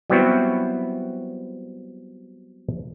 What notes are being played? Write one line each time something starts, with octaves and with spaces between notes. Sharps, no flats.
F#3 G3 B3 C4 E4 F#4